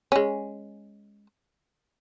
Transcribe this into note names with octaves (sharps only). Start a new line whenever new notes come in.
G#3 C#4